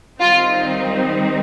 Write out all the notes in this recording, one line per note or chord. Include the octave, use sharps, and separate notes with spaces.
D#3 G3 C4 D#4 F4